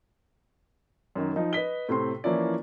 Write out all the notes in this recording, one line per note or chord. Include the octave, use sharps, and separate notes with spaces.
F#2 D#3
F3 D#4
B4 D#5 B6 G7
A2 C3 C4 C6
E3 F3 A#3 C#4 E4 D5